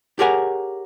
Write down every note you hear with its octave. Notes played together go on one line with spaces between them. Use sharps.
G4 G#4 A#4 C#5 F#5 G#5